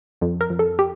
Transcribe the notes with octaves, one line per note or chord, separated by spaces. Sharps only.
F2
A#4
F2
A4
G4